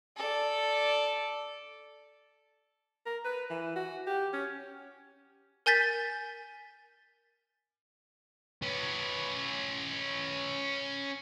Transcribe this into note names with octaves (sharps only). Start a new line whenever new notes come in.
A4 D5
A#4
B4
E3
F#4
G4
C#4
A#4 G#5 G6 A6 B6
C#4 B4